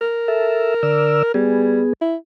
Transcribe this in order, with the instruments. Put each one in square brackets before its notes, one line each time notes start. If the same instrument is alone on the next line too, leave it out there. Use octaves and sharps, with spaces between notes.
[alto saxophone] A#4
[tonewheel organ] A4 E5
D3 D5 E6
[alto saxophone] G3 [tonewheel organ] B3 G#4
[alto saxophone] E4